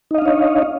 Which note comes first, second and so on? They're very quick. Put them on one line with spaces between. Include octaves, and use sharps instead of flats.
D#4 D#5 F5 D4 C#5